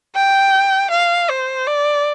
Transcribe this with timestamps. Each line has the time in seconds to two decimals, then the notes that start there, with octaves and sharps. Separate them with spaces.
0.15 G5
0.90 F5
1.29 C5
1.67 D5